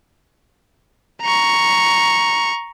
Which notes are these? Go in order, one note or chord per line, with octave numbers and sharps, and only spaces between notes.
A#5 C#6